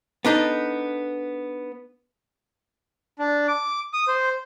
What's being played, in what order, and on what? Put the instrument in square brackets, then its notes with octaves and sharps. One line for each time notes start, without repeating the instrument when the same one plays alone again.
[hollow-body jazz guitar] B3 D4 D#4 A4
[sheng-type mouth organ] D4
D6
D#6
C5